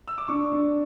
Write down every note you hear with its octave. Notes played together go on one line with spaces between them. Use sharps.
E6
D6
D4 C#6
D4